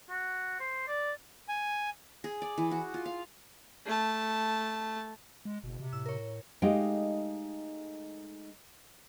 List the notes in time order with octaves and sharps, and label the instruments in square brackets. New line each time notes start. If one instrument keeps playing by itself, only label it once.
[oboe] F#4
C5
D5
[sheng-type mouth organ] G#5
[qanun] G#4
D5
E3
F#4
F4
F5
[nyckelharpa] A3 A5
[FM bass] G#3
[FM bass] F#1 [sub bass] B2
[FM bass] C3
[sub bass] A2 [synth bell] E6
[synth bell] A#4 C#5
[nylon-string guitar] G#3 A3 D#4 G4 F5 G5